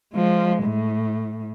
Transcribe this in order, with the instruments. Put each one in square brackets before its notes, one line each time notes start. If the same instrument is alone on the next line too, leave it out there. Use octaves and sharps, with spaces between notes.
[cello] F3 G#3
A2